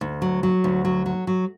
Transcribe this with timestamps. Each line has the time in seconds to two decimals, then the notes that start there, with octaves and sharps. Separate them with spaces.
0.01 D2
0.22 F#3
0.43 F#3
0.64 D2
0.85 F#3
1.06 F#3
1.27 F#3